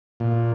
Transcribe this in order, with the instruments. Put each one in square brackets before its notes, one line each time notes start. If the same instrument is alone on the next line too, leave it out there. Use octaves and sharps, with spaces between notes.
[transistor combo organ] A#2